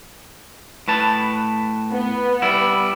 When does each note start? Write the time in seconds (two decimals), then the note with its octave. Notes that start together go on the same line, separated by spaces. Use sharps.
0.88 A2 B4 A5
1.92 B3
2.42 G3 E4